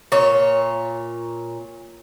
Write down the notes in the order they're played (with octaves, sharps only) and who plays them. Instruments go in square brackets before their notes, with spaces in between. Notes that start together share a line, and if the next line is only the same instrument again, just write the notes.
[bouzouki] A#2 C#5